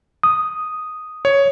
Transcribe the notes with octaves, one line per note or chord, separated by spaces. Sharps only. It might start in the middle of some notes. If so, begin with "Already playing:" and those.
D#6
C#5